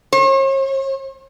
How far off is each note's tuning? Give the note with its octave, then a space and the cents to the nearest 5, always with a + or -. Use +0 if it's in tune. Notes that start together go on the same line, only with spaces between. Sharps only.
C#5 -45